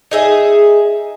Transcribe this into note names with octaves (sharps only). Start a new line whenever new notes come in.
D#4 G#4 E5